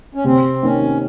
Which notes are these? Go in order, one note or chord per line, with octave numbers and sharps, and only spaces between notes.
C#4
C3 C4
D#3 A#3 C#4